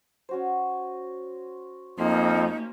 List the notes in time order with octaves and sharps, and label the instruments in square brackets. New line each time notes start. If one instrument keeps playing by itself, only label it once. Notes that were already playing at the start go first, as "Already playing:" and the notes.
[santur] C#4 F#4 C5
[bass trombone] F2 [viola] A#3 C#4 [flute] D#4 [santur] C6